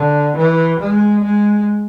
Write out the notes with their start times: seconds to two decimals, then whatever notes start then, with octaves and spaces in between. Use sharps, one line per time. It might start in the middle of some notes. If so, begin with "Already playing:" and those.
Already playing: D3
0.37 E3
0.80 G#3
1.24 G#3